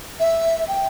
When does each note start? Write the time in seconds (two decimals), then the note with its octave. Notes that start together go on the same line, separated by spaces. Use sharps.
0.20 E5
0.68 G5